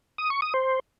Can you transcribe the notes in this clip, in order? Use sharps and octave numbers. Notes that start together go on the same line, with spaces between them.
D#6
C#6
D#6
C5